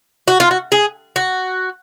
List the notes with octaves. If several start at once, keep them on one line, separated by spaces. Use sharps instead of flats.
F#4
F4
F#4
G#4
F#4